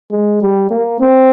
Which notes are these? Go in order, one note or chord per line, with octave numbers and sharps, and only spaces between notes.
G#3
G3
A#3
C4